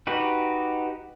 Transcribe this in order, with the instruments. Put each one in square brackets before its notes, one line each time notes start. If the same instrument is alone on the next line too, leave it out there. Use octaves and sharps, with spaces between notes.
[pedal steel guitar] D#4 F#4 G4 B4